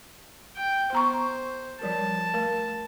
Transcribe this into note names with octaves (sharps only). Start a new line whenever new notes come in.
G5
B3 C5 A#5 C#6
F3 G3 A#4 A5
A3 A#4